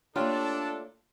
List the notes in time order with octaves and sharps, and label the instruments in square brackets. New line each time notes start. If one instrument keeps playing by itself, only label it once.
[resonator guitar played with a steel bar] A3 F4 G4 [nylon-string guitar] A#3 C#5 [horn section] D4 [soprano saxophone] A4